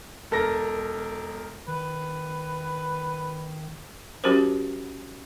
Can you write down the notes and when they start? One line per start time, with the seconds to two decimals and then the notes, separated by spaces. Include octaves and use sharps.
0.31 E1 A4 A#4 A#6
1.68 D#3 B4
4.24 F#3 C#4 F#4 G4 A#4 C5